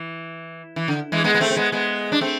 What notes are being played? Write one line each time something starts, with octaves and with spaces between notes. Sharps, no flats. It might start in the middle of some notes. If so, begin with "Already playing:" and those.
Already playing: E3
E3
D3
E3 G#3
G#3 B3
B3
A3 C4
C4
G#3 B3
G#3 B3
D4
A3 C4